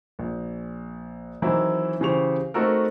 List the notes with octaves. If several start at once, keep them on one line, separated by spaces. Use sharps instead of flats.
A#1
D#3 E3 F#3 C4 E4
C#3 E3 G4 C5 C#6 F7
A3 C4 D#4 F#4 A4 A#4